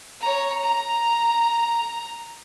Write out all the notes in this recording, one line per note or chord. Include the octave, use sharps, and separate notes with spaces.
C#5 A#5
A#5